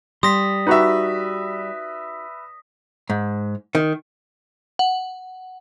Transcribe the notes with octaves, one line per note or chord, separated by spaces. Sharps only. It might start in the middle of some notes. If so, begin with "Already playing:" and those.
G3 C6 D#6 A#6 B6
D#4 F#4 G4 B4 E5
G#2
D#3
F#5